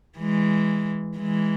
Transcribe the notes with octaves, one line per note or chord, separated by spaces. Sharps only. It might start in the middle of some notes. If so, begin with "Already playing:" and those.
E3 G#3
E3 G#3